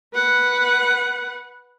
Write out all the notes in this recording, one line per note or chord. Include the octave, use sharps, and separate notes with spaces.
B4 F#5